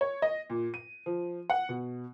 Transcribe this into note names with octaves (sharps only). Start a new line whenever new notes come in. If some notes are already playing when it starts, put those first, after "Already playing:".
C#5
D#5
A#2
D#7
F3
F#5
B2